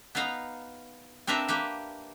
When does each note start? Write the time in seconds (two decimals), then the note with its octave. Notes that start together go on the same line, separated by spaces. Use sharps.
0.15 B3 D#4 B4 F5 A#5
1.27 C4 D4 A#4 B4 E5 F5
1.48 A#3 G4 B4